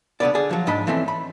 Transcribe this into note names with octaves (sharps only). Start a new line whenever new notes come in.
C#2 D3 B3 D5
D3 G#4 D5
F3 F#3
B1 G#2 D4 D#5 B5
E3 A3 C4 C#4
B5